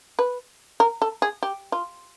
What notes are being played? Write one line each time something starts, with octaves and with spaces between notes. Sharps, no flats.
B4
A#4
A4
G#4
G4
F4